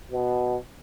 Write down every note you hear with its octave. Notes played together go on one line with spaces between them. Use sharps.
B2